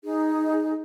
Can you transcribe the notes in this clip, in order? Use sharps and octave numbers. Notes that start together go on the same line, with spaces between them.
D#4 G#4